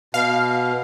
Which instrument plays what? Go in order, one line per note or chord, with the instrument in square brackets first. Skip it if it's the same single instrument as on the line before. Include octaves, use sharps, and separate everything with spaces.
[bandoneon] B2 [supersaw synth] F5